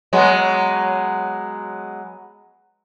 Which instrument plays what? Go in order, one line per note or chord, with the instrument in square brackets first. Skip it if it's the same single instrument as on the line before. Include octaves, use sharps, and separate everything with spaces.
[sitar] F#3 G#3 B3